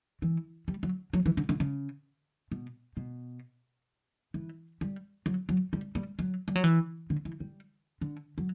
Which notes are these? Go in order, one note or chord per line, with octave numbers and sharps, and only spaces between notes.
E3
G3
F#3
F#3
E3
D3
D3
C#3
B2
B2
E3
G3
F#3
F#3
G3
G3
F#3
G3
F#3
E3
D3
E3
G3
D3
F#3